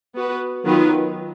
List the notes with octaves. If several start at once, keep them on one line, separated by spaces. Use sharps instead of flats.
B3 F#4 B4
D#3 F#3 B3 F4 B4